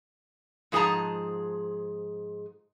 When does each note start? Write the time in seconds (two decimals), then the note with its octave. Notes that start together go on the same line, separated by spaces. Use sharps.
0.72 G#2 F3 G#4 A4 A5 A#5